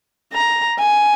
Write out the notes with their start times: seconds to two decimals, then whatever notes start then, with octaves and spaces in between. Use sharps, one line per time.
0.33 A#5
0.79 G#5